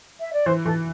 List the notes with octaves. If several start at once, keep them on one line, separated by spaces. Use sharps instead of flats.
E5
D5
E3 C5
E3 A4